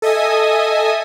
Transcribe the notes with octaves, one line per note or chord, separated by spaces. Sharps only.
A4 D#5 E5 G#5 D#6